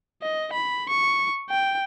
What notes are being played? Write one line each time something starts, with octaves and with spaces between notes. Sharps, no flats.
D#5
B5
C#6
G5